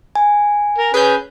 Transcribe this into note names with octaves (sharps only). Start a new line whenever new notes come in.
G#5
A#4
C#4 G#4 B4 G6